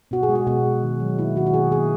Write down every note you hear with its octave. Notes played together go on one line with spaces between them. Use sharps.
B2 F#4
G#4
G#3
F#4
B2 F#4
G#3
D#3
F#3
A#3 E4
D#3 F#4
F#4
B2 G#4
A#3 G#4